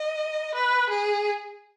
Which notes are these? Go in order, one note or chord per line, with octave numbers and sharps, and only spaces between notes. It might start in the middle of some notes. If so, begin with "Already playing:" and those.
Already playing: D#5
B4
G#4